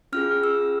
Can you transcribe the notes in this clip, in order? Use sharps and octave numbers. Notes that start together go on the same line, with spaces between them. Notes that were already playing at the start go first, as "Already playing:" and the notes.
C#4 F4 G#4 F6
E6